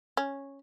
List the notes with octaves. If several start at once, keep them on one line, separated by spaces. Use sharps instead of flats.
C#4